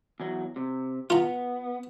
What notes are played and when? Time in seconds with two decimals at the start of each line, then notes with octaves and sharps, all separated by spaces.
0.20 E2 F#3
0.56 C3
1.10 B3 F4 A#5